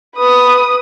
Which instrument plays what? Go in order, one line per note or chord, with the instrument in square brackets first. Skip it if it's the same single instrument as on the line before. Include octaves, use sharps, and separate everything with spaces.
[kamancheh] B4 D#6